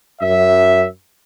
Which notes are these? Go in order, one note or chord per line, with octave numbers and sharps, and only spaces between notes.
F#2 E5